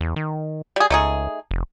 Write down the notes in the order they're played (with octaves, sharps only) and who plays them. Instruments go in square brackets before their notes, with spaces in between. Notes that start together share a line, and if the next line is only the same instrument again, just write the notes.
[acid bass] E2
D#3
[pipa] G3 G#4
[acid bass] C#2 [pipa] A3 D#4 G#4
[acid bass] F1